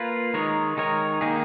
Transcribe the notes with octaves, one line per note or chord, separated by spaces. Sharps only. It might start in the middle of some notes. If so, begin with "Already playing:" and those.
Already playing: A#3 F4 B4
D#3 G#3 D#4 A#4 C#5
D#3 G#3 D#4 A#4 C#5
D#3 A#3 D#4 G#4